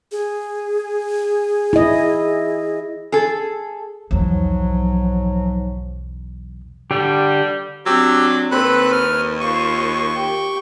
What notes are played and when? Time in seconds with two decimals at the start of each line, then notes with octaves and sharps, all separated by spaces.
0.12 G#4
1.73 E4 D#5
3.12 G#4 A4
4.11 B1 E2 G#2 F3 F#3
6.91 D3 G3 G4
7.86 F#3 C4 D4 G4 E6
8.51 D#2 C4 A4 B4 B5 F#6
8.92 F6
9.41 F4 C5 C#6
10.14 G4 G5